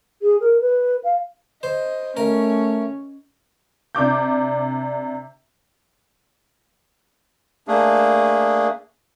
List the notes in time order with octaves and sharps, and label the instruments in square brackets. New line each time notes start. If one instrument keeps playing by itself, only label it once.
[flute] G#4
A#4
B4
F5
[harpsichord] C5 [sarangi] D#5
[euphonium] A3 [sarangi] C#4 [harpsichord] A#4
[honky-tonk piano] C3 D4 D6 G6
[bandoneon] A3 A#3 D4 G#4